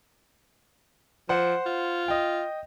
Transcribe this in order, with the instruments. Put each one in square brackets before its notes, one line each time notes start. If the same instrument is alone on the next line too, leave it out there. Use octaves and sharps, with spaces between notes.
[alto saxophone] F3 [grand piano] C5 F#5
[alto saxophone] F4
[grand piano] D#5 G5